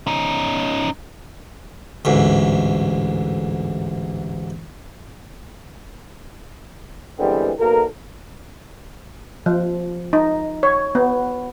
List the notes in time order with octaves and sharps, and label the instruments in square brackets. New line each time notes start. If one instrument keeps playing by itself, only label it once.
[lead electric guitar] C#4 D#4
[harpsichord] A1 D2 G#2
[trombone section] D3 E3 G3 G#3 B3 C4
B1 B2 A#3 A4 A#4
[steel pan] F3
D#4
C#5
B3